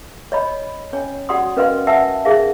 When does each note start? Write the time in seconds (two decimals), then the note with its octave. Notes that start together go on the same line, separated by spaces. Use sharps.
0.32 C#5 D#5 B5
0.93 C#4 C#5 G#5
1.29 F#4 D5 F#5 C6 D#6
1.57 C#4 A#4 B4 D#5 F5 C6
1.87 E5 F#5 G#5 A5 E6
2.25 D#4 G#4 A#4 E5 F5